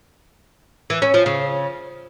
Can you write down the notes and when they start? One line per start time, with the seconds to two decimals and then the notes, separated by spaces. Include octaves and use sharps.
0.90 E3
1.02 C#4
1.14 F3
1.26 C#3